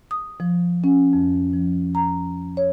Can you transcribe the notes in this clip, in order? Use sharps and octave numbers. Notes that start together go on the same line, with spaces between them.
D#6
F3
C#4
F2
F3
A#5
C#5